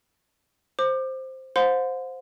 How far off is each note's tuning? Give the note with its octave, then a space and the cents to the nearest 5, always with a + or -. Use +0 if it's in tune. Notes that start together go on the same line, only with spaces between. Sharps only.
C5 +5 D6 +30
C5 +0 F#5 -45 C6 -30